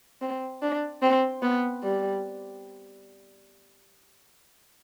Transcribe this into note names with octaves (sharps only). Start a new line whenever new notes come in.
C4
D4
C4
B3
G3